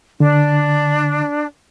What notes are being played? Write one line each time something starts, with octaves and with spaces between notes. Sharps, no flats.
D3 D4